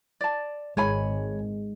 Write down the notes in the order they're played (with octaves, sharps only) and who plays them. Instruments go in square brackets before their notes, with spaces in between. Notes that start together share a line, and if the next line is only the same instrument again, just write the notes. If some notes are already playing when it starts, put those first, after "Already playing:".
[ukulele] D5 A5
[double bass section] G#1 [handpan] G#3 [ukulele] C#5 G#5 B5